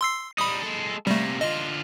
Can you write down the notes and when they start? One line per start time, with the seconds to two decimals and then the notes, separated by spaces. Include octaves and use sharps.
0.01 C6 E6 C7
0.38 G3 D#4 B5 D#6
0.62 G#3 A4
1.07 C3 G3 A3 A#3
1.41 D3 F4 D#5